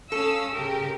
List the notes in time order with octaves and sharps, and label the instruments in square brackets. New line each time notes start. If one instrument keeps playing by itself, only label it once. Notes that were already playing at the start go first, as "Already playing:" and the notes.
[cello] C#4 [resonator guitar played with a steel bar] A4 [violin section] F5 D#6 E6
[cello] C#3 A#4 [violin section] G4